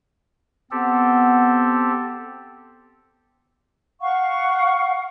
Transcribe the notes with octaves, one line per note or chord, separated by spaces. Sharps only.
B3 C4 G4 A4
F5 F#5 C#6